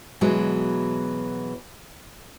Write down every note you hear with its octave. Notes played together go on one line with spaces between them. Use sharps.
B2 E3 F#3 G#3